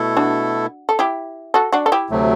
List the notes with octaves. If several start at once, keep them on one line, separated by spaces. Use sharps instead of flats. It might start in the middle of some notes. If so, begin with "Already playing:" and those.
Already playing: B2 A3 E4 A4
D4 F#4
A4
E4 G4
F#4 A4
D4 F#4
A4
E4 G4
D2 C3 F#3 A3